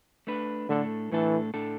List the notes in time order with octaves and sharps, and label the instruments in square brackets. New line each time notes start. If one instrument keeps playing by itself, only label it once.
[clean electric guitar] A3 D4 B4
[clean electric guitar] A2 A3 D4 A4 [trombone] D3
[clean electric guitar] A2 A3 D4 A4 [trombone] E3
[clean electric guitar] A2 A3 D4 A4